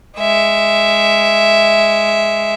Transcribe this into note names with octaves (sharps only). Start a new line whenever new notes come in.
G#3 E5